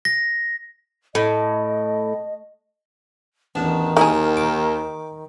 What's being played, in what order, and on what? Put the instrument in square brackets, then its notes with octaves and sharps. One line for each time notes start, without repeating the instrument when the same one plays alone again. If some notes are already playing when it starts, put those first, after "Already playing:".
[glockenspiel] A#6
[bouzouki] A2 [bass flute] D#5
[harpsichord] A1 E2 [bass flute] D#3 [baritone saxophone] D4
[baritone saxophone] D#2 [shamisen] D#4 E4 G#4 [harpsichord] A#4
[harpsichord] D6